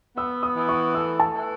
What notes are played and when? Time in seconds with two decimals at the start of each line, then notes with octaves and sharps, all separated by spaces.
0.16 B3 E6
0.43 D#6
0.56 E3
0.69 C#6
0.94 A3 E6
1.20 A5
1.33 E3